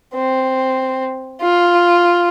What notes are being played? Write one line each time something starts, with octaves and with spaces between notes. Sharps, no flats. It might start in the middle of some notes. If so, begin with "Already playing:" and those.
C4
F4